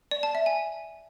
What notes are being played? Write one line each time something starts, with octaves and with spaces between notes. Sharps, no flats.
D5
A5
E5
G#5